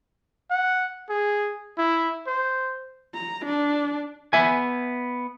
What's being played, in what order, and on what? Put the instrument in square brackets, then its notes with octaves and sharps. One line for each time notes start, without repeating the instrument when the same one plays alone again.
[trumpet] F#5
G#4
E4
C5
[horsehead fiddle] A#5
D4
[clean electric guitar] B3 E5 G#5